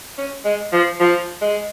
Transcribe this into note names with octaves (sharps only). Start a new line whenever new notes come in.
C#4
G#3
F3
F3
G#3